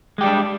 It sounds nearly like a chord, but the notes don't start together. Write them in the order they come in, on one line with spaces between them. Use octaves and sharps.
G#3 G4 G3 D4